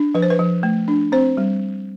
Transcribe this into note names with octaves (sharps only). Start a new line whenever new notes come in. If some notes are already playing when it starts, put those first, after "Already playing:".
Already playing: D4
F3 B4
C5
B4
F3
A3
D4
C4 C5
G3